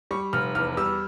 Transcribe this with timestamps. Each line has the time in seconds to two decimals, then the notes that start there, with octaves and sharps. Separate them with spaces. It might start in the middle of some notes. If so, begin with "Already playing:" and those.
0.11 G3 C#6
0.33 F1 F6
0.55 E2 F6
0.77 G3 E6